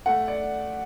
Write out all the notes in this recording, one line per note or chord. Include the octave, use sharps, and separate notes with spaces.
A3 F#5
D5